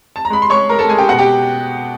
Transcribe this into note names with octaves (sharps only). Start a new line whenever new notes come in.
A5
A#5
G#3 B5
C6
G#3 C#5 C#6
G#3 A#4 A#5
A4 A5
G#3 G#4 G#5
G4 G5
B2 F#4 F#5
G4 G5